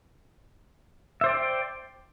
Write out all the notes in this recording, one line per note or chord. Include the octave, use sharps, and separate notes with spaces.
C5 D5 E5 G5